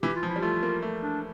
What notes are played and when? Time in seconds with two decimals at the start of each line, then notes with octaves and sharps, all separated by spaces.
0.02 E3 G4
0.16 F4
0.23 F3
0.28 E4
0.36 G3
0.42 A3 F4
0.63 A#3
0.82 A3
1.03 D4